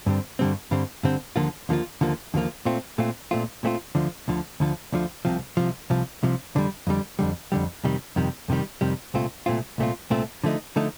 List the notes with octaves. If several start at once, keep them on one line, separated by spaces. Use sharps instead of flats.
G2 D3 G3 C4
G2 D3 G3 C4
G2 D3 G3 C4
G2 D3 G3 C4
D#2 D3 F3 A#3 F4
D#2 D3 F3 A#3 F4
D#2 D3 F3 A#3 F4
D#2 D3 F3 A#3 F4
A#2 A3 C4 F4
A#2 A3 C4 F4
A#2 A3 C4 F4
A#2 A3 C4 F4
D2 D3 F3
D2 D3 F3
D2 D3 F3
D2 D3 F3
C2 C3 F3
C2 C3 F3
C2 C3 F3
C2 C3 F3
F2 D3 G3
F2 D3 G3
F2 D3 G3
F2 D3 G3
F2 C3 D#3 G3
F2 C3 D#3 G3
F2 C3 D#3 G3
F2 C3 D#3 G3
C2 A#2 A3 C4 F4
C2 A#2 A3 C4 F4
C2 A#2 A3 C4 F4
C2 A#2 A3 C4 F4
D3 F3 A3 D#4
D3 F3 A3 D#4